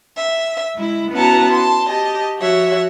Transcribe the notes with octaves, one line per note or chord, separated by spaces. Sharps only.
E5
G#3 E4
B3 C#4 E4 F#4 A5 A#5
A5 C6
G4 D#5 A5
F3 F#4 C#5 E5